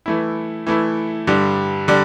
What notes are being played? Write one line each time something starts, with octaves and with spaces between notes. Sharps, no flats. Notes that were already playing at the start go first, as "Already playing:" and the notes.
E3 A3 E4
E3 A3 E4
G2 D3 G3 D4
D3 G3 D4